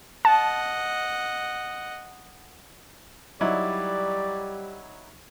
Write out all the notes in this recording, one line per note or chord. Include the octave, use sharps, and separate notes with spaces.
D#5 F#5 A5
F#3 G3 D#4 E4 D5